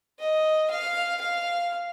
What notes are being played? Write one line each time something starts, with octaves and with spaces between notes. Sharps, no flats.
D#5
F5
F5